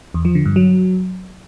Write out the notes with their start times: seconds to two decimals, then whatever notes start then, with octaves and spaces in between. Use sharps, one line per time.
0.14 E2
0.25 F3
0.35 D3
0.46 G2
0.56 F#3